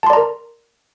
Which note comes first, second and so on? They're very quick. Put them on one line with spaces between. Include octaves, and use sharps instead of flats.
A5 C6 D5 A#5 A#4